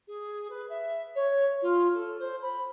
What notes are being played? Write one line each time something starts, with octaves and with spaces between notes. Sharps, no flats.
G#4
B4
E5
C#5
F4
A4
C5
B5